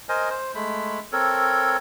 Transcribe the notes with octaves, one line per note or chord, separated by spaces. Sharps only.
A#4 C5 D#5 G#5
C5
G#3 A3 B5
C4 A4 A#4 C#5